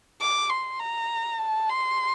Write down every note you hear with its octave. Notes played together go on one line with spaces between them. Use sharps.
D6
C6
A#5
A5
C6